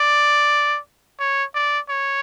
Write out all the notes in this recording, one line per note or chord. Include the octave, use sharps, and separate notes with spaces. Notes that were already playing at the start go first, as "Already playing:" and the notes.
Already playing: D5
C#5
D5
C#5